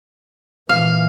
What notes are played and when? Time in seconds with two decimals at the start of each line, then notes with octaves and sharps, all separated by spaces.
0.69 A#2 E3 F5